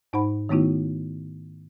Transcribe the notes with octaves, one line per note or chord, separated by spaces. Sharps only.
G#2 D#4 C5 F#5 B5
D#3 A3 B3 D#4 E4 F#4